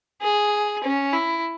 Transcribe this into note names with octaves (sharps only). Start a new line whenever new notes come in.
G#4
C#4
E4